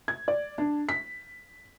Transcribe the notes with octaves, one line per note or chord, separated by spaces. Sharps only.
G#6
D5
D4
B6